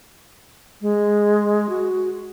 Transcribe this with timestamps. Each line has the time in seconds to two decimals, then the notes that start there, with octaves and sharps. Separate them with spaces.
0.81 G#3
1.69 F#4